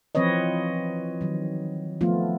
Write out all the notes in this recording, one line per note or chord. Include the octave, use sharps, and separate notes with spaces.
E3 F3 C4 B4 C#5 D#5
D#3 F#3
F3 A3 B3 F4